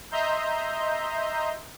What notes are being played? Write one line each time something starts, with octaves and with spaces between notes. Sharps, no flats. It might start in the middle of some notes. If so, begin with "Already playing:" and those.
D#5 E5 A#5 C6 G6